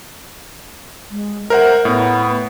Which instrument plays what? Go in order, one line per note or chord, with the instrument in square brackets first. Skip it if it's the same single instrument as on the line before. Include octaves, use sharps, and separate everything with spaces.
[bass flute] G#3
[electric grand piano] A#4 C5 F#5 [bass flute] E5
[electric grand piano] A2 [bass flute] B3